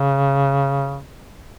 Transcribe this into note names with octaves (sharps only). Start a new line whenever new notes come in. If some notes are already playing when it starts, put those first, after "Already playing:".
Already playing: C#3